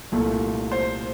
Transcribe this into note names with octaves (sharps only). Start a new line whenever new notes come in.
C2 A#2 A3
C5